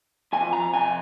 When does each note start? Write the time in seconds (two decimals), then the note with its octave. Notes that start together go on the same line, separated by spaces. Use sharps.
0.33 F2 C3 F3 G#5
0.53 A#5
0.73 F2 C3 G#5